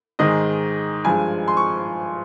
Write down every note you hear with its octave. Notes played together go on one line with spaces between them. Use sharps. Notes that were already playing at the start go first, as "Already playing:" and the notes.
G#2 D#3 G#3 D#5
G2 F3 G#3 G#5
C6
C#6